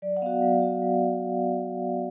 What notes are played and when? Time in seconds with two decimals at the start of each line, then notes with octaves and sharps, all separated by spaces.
0.02 F#3 D5
0.17 F#5
0.22 B3 F#4 F5
0.42 F#3
0.62 B3 F#4
0.82 F#3